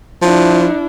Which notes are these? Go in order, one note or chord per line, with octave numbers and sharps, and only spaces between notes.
F3 D4 E4